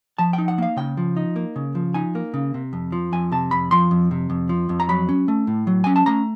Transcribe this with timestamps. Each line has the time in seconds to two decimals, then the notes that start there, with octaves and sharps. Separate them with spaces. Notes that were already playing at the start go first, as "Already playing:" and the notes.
0.19 F3 A5
0.33 G5
0.38 D#4
0.48 F#5
0.58 A#3 F5
0.77 C#3 G5
0.97 F3
1.17 D#4
1.36 A#3
1.56 C#3
1.75 F3
1.94 D#4 G#5
2.15 A#3
2.34 C#3
2.54 C3
2.73 F2
2.92 F3
3.12 F2 G#5
3.32 C3 A5
3.51 F2 B5
3.71 F3 C6
3.91 F2
4.11 C3
4.30 F2
4.49 F3
4.69 F2
4.80 A#5
4.89 F#3 B5
5.09 C#4
5.28 A3
5.47 A2
5.67 F#3
5.84 C#4 G#5
5.96 A5
6.06 A3 A#5